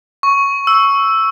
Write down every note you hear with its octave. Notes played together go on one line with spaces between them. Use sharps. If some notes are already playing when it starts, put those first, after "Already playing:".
C#6
E6